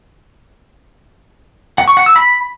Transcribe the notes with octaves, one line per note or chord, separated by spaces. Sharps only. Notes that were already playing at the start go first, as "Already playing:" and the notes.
F#5
C#6
F#5
E6
B5